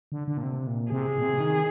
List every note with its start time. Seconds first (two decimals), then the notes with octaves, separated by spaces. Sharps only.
0.12 D3
0.28 D3
0.37 A#2
0.43 C3
0.67 A#2
0.92 C3 G#4
1.18 A#2
1.23 C3
1.40 D#3